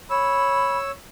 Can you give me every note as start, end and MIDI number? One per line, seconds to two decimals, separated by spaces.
0.10 0.91 73
0.10 0.78 83
0.10 0.91 88